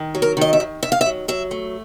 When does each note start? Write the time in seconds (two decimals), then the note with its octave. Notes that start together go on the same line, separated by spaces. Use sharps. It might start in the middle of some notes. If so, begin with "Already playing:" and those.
Already playing: D#3
0.15 F#3
0.22 A#4
0.37 D#3 D#5
0.53 E5
0.60 D#3
0.83 D#3 E5
0.92 F5
1.01 E5
1.06 F#3
1.28 F#3 E5
1.51 A3